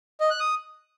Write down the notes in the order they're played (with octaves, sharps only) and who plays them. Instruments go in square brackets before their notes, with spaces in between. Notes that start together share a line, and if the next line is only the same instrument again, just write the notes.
[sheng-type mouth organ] D#5
F#6
D#6